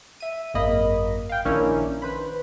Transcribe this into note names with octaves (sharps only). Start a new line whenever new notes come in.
E5 D#7
G#1 F#2 A#3 D#5 B5
F5 G5
A#1 D#3 A#3 C#4 D4 E4
B4 C5 B5